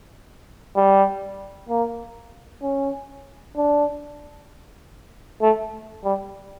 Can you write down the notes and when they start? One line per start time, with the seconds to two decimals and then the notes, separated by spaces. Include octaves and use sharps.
0.76 G3
1.69 A#3
2.62 C#4
3.57 D4
5.42 A3
6.04 G3